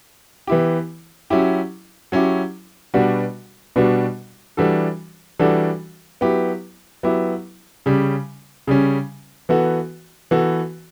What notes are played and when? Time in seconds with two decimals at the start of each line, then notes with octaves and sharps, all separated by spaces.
0.47 E3 B3 E4 G4
1.30 F#3 C#4 E4 G4
2.12 F#3 C#4 E4 G4
2.94 B2 G3 B3 D4 F#4
3.76 B2 G3 B3 D4 F#4
4.57 E3 G3 D4 F#4 A4
5.39 E3 G3 D4 F#4 A4
6.21 F#3 B3 E4 G4
7.03 F#3 B3 E4 G4
7.86 C#3 G3 C#4
8.67 C#3 G3 C#4
9.49 E3 B3 F#4 A4
10.31 E3 B3 F#4 A4